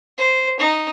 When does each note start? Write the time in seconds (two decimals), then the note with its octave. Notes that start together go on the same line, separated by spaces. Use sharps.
0.18 C5
0.59 D#4